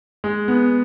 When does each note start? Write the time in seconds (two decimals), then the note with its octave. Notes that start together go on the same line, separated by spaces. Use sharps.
0.24 G#3
0.48 B3